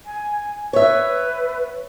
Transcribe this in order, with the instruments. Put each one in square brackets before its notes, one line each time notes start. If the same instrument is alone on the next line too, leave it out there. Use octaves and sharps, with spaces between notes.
[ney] G#5
[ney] B4 [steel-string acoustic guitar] C#5 E5